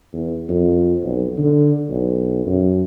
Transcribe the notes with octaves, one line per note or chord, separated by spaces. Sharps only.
E2
F2
B1
D3
B1
F#2